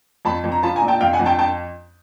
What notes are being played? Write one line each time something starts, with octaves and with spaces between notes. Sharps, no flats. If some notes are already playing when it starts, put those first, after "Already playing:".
F2 A5 B5
F2
A#5
F3 A5 B5
G#5 A#5
A#2
G5 A5
F2 F5 G5
F#5 G#5
F2
G5 A5
G5 A5